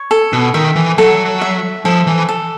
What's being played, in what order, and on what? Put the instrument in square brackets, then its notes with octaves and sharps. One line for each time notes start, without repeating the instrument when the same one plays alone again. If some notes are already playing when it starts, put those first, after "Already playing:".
Already playing: [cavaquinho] C#5
A4
[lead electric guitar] B2
[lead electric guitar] D#3 [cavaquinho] E5
[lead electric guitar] E3
[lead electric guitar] F#3 [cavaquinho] A4
[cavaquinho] E5
[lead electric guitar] F3 [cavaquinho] A4
[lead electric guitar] E3
[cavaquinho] A4